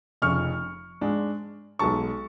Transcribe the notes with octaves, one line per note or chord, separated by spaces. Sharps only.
F1 F2 C#3 C#6 F6
G#2 G#3 D4
B1 B2 G#3 A5 C#6